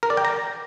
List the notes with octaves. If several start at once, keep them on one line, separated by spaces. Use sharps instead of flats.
A#4
D5
G5
A#5